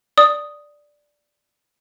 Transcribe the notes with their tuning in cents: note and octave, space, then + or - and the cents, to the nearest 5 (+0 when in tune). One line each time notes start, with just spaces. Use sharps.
D5 +0 D#6 +0